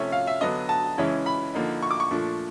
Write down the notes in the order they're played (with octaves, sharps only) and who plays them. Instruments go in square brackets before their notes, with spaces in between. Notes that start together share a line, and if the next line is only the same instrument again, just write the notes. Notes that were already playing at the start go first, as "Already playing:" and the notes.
Already playing: [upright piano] C3 F3 A3 C#4 E5
F5
E5
D3 F#3 B3 D4 D#5
A5
C#3 E3 G#3 C#4 E4
B5
D3 F3 A#3 D#4
C#6
D6
C#6
A#2 F3 A3 D4